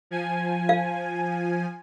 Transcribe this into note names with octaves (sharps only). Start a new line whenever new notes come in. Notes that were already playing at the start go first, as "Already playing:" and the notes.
F3 G#5
F5